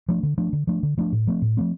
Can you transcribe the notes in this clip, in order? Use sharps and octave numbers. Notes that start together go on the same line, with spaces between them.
F3 A3 D4
D3
F3 A3 D4
D3
F3 A3 D4
D3
F3 A3 D4
A2
F3 A3 C4
A2
F3 A3 C4